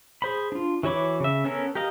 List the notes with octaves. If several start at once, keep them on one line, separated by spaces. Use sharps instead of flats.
G#4 C5 B5
D4 F4
E3 F#4 C#5 B5 D6
C#3 E5
B3 C#4 A4 A#4
G4 A#4 D#5 F5